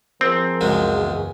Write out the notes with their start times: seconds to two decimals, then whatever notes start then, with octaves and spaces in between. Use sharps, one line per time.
0.21 F3 C4 G#4 A#4
0.61 C#2 F#2 G#3
0.95 E2 G#4